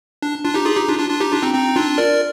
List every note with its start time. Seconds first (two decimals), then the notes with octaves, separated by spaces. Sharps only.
0.22 D4
0.45 D4 F4
0.54 D#4 G4
0.66 F4 G#4
0.77 D#4 G4
0.88 D4 F4
0.99 D4 F4
1.10 D4 F4
1.20 D#4 G4
1.31 D4 F4
1.42 C4 D#4
1.54 C4 D#4
1.76 D4 F4
1.98 A#4 D5